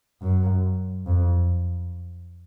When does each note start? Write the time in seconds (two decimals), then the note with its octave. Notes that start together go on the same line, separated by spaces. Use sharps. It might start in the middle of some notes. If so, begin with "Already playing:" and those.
0.22 F#2
1.06 F2